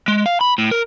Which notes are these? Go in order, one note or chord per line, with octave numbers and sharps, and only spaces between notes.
G#3
F5
B5
A2
A#4